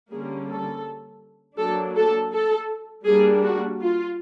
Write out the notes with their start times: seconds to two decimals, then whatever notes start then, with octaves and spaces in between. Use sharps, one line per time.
0.11 D3 G3 A#3 C#4 G#4
0.49 A4
1.59 F#3 A#3 D4 A4
1.96 A4
2.33 A4
3.06 G3 A#3 D4 G#4
3.44 F#4
3.81 F4